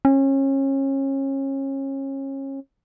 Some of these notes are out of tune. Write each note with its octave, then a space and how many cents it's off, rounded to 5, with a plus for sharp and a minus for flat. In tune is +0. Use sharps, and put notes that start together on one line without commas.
C#4 -30